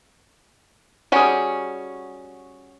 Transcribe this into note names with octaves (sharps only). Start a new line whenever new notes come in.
G3 C#4 F#4 G#4